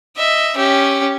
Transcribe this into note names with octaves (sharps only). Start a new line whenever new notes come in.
D#5 E5
C#4 G4